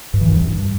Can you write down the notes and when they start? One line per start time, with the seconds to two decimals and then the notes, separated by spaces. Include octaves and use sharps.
0.14 G2
0.21 E3
0.28 F#2
0.36 G2